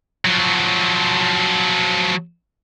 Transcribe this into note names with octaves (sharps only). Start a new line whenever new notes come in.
F3 F#3